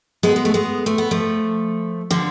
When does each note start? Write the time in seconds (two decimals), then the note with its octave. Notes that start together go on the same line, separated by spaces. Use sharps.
0.23 G#3 B3
0.36 G#3
0.45 A3
0.54 G#3 B3
0.86 A3
0.98 B3
1.11 F3 A3
2.11 D3 F3